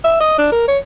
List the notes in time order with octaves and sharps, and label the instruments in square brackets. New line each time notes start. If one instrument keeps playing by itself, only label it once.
[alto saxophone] E5
D#5
D4
A#4
C#5